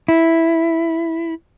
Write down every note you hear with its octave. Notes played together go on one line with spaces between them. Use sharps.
E4